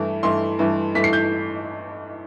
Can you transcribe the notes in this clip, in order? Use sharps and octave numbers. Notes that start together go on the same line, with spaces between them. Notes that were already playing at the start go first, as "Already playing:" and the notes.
Already playing: G2 E3 A3 E4
G2 E3 A3 E4 C6
G2 E3 A3 E4
G2 E3 A3 E4 B6
C7
G6